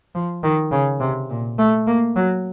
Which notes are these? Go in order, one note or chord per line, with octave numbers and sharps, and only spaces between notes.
F3
D#3
C#3
C3
A#2
A3
A#3
F#3